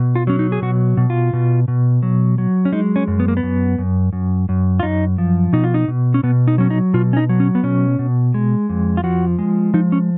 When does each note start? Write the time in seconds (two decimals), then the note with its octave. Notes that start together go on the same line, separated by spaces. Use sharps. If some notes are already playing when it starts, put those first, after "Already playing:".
Already playing: B2
0.16 F4
0.27 F#3 C#4
0.39 D#4
0.52 G#4
0.62 B2 F#4
0.97 B2
1.10 F4
1.33 B2
1.68 B2
2.03 F#3
2.38 F#3
2.65 C#4
2.72 G#3 D#4
2.96 C#4
3.08 F#2
3.20 B3
3.28 A#3
3.37 B3
3.43 F#2
3.78 F#2
4.13 F#2
4.49 F#2
4.80 F4
4.83 F#2 D#4
5.18 F3
5.53 B2 D#4
5.64 F4
5.74 D#4
5.88 B2
6.14 C#4
6.23 B2 B3
6.48 D#4
6.58 F#3 C#4
6.70 D#4
6.94 B2 F4
7.13 C#4
7.17 D#4
7.29 F#3
7.40 C#4
7.55 B3
7.63 B2 C#4
7.99 B2
8.34 G#3
8.69 F2
8.97 F4
9.04 F3 F#4
9.39 G#3
9.74 F3 D#4
9.92 C#4